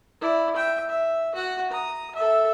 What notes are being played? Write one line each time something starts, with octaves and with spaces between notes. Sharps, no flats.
E4 D5
E5 G5
E5
F#4 F#5
A#5 D#6
A4 E5